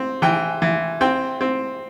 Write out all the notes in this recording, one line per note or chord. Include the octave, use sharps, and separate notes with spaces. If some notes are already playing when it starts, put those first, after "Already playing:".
Already playing: C4
E3 G5
E3
C4 G5
C4